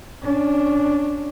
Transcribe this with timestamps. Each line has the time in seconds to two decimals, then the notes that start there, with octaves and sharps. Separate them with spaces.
0.23 C#4 D4